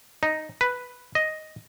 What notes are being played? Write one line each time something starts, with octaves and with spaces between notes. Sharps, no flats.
D#4
B4
D#5